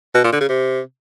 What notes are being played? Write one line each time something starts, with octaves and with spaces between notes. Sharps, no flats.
B2
A#2
D3
C#3
C3